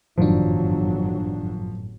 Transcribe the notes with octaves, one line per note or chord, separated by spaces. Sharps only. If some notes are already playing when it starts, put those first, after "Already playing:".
G1 F#2 A2 D#3 F3 F#3 D4